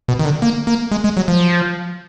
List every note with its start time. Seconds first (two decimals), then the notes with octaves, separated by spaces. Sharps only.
0.08 B2
0.19 D#3
0.25 D3
0.42 A#3
0.67 A#3
0.91 G#3
1.04 G#3
1.17 F#3
1.28 F3